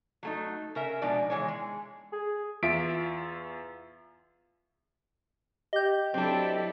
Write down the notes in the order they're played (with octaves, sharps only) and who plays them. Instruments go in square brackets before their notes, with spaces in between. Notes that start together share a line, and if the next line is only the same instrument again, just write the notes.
[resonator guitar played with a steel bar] F#3 A3 D#4
C#3 A#4 E5
B2 F3 G#3 D4 D#4 D5
D#3 E3 G#3 C#5
G#3
[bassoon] G#4
[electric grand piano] E2 F4 E5 B6 D7
[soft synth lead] G4 [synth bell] D#5 G6
[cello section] F#3 E4 A4 [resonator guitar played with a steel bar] C4 D4